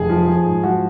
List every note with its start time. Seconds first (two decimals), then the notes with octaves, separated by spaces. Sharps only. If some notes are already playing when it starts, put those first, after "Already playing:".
Already playing: F1 G#4
0.10 F3
0.28 F3
0.46 G#2
0.63 F3 F#4